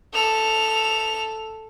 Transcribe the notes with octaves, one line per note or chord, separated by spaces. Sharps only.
A4 F7